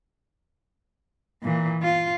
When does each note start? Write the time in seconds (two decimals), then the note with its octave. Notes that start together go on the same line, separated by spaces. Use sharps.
1.43 A#2 E3
1.82 F4